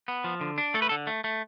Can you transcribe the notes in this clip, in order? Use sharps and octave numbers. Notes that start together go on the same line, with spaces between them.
B3
F3
D3
D4
A3 A4
B4
D3 A4
A3
A3